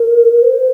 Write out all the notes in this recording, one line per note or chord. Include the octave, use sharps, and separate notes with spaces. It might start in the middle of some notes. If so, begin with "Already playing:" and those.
Already playing: A#4
C5